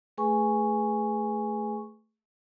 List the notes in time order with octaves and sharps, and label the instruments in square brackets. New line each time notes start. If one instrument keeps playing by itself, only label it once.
[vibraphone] A3 G#4 B4 G#5 C#6